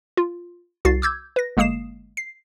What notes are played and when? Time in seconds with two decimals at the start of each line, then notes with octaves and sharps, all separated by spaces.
0.17 F4
0.85 C2 F#4 A6 C7
1.02 D6 E6 G6 G#6
1.36 B4 A#6
1.57 G1 G#3 A#3 D#6 C7 E7
2.17 C7